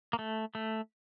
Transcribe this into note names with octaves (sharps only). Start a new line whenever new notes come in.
A#3
A3
A3